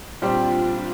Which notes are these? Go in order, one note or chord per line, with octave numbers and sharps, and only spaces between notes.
A#2 G3 C4 D4 F4 G4
D4 F4